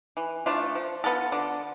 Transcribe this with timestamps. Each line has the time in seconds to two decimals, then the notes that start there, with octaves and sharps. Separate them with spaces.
0.17 E3
0.46 A3 D4 F4
0.75 F3
1.04 B3 F4 A4
1.32 D3